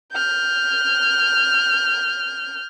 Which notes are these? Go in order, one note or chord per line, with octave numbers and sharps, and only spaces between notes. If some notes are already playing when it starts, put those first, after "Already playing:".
F6 G6